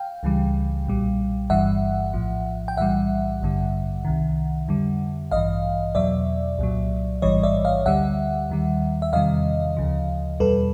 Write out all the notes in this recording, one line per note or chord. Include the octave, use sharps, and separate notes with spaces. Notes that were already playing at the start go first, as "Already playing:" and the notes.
Already playing: F5 G5
C#2 C#3 E3 G3
B1 A#2 G3
G1 G2 E3 G3 E5 F#5
A#1 A2 F3
G5
B1 A2 E3 G3 E5 F#5
A1 G2 D3 G3
C2 C3 D#3
F2 D3 G3
A1 G2 E3 D#5 F5
E2 B2 F#3 D5 E5
C2 A#2 F#3
A1 G#2 E3 G3 C#5 D#5
D5 E5
D#5 F5
D2 D3 G3 E5 F#5
D#2 D#3 G3
E5
E2 C3 D#3 G3 D#5 F5
D2 C#3 F3
E2 B2 G3 A4 B4